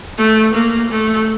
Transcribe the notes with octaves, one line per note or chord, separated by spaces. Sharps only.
A3
A#3
A3